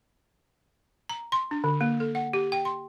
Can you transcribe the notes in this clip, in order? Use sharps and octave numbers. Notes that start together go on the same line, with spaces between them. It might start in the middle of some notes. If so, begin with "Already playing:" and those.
A#5
C6
D4
D3
A#3
A4
F#5
G4
G5
C6